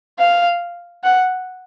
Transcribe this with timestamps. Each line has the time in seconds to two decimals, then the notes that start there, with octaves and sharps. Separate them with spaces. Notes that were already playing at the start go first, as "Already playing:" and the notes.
0.19 F5
1.04 F#5